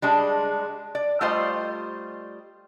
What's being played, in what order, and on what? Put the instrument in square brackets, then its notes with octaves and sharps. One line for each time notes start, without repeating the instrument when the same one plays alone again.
[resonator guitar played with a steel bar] G3 G#3 D4
D5
G3 A3 F4 G4 C5 D#5